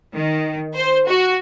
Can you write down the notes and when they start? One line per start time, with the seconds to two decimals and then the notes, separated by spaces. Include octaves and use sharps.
0.15 D#3
0.73 C5
1.06 F#4